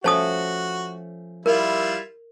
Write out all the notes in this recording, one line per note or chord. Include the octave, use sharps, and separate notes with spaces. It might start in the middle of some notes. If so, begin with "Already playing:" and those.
F3 A3 C#4 F#4 C5 A5 D#6
G3 E4 F4 A#4